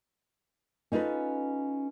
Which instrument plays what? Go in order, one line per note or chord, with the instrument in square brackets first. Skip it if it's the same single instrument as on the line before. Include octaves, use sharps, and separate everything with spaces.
[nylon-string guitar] C#4 D#4 F4 A4 B4